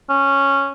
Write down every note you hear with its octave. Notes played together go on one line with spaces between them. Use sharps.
C#4